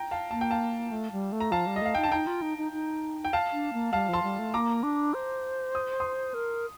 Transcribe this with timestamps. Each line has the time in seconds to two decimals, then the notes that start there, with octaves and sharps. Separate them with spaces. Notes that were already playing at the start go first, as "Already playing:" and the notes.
Already playing: G5 A#5
0.11 F5 A5
0.31 A#3 A5
0.41 G5
0.51 F5 A5
0.92 A3
1.12 G3
1.32 A3
1.40 A#5
1.51 F3 F5 A5
1.67 G3
1.76 D#5
1.81 A3 F5
1.95 D#4 G5
2.03 A5
2.08 D4
2.12 D#4 G5 A#5
2.27 F4
2.42 D#4
2.58 D#4
2.72 D#4
3.25 G5
3.33 F5 A5
3.52 D4
3.73 A#3
3.93 G3 F5 A5
4.09 F3 A5 C6
4.23 G3
4.39 A3
4.54 A#3 A#5 D6
4.83 D4
5.14 C5
5.75 D#6
6.00 C6 D#6
6.34 A#4